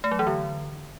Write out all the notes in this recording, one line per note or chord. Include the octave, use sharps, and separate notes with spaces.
A3
F#3
E3
D3